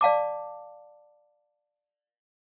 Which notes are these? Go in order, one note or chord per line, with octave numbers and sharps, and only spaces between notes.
D5 F5 A5 D6